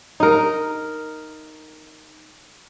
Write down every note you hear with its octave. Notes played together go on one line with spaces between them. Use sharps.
D#4 A#4